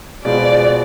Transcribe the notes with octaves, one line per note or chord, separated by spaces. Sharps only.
B2 G#3 B3 F4 C5 D5